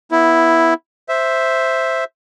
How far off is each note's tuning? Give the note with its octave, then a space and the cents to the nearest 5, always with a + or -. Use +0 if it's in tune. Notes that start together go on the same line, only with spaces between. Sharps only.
B3 -15 E4 +0
C5 +0 E5 +0